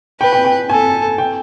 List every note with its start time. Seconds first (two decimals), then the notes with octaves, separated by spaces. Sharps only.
0.20 B4 G5
0.33 G5
0.45 G5
0.70 A4 G#5
1.18 G5